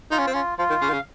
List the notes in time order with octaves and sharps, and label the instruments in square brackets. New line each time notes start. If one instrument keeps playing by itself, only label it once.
[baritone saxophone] D#4 [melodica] F4
[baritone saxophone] C#4
C4
[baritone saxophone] C#4 [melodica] F4
[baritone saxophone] F3 [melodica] F4
[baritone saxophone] D#3
[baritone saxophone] C#3 [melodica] F5
[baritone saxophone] D#3
C#3